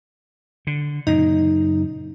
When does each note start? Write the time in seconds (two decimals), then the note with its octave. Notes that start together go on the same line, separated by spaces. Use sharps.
0.67 D3
1.07 F#2 A#2 C#3 D#4